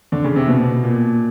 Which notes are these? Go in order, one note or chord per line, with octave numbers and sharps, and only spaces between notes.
D3
C#3
C3
B2
A#2